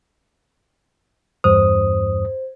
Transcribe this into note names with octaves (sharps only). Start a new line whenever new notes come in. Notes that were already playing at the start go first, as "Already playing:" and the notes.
E2 G2 C5 D#6